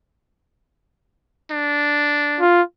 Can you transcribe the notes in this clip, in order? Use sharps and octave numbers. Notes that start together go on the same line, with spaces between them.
D4
F4